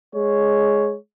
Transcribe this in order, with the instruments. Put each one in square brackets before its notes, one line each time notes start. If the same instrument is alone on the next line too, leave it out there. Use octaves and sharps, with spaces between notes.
[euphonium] G#3 [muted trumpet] C#5